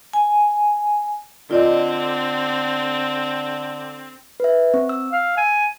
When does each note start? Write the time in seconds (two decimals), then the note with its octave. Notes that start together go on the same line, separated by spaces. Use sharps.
0.13 G#5
1.51 D3 C4 F4 D5 D#5
4.40 B4 E5
4.74 C4
4.89 E6
5.12 F5
5.37 G#5